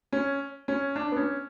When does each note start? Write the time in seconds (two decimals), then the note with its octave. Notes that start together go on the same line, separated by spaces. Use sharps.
0.12 C#4
0.68 C#4
0.96 D4
1.12 B3
1.16 C#4